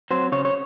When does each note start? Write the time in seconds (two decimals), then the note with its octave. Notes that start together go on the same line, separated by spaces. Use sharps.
0.11 F#3 C4 C5
0.32 C#3 C#5
0.45 C#5